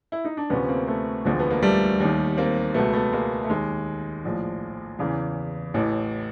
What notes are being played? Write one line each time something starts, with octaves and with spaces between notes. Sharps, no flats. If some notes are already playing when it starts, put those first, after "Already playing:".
E4
D#4
D4
D2 C3 F3 B3 C#4
A#3 C4
A3 B3
E1 D2 D3 F3
B3
A#3
G3 A3
D#2 D#3
A#3 C4
C#2 B2 A3 B3
A3 B3
G#3 A#3
A3
D#2 D#3 G#3
A#1 A2 F3
E2 C#3 E3
A1 A2 E3